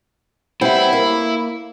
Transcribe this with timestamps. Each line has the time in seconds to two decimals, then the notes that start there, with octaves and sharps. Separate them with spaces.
0.61 G3 B3 C4 E4 E5
0.93 A#3